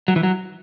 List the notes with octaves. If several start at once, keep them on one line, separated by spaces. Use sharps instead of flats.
F#3
E3
F#3